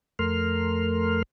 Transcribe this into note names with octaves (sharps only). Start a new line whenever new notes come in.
F2 A3 A#4 C6 F6